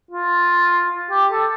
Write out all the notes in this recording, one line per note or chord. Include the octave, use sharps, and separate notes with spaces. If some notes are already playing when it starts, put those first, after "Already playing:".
F4
G4
A4